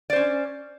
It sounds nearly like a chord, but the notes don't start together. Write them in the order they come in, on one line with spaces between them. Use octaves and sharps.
D5 C5 C#4